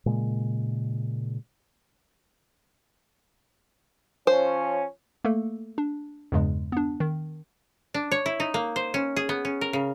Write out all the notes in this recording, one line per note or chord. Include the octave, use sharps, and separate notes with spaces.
A#2 C#3 G#3
F3 C#4 C5
A3 A#3 A4
D4
E2 G2 C#3 G#3
B3 D4
D#3
D4
C#5
E4
D#4
A#3
C5
C#4
G#4
B3
C#4
A#4
C#3